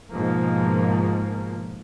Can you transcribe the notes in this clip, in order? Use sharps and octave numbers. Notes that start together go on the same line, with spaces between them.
G#2 B2 F3 A#3